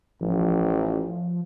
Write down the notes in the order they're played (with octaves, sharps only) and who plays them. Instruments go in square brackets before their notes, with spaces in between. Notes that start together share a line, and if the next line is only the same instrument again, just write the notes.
[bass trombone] A1 [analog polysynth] F3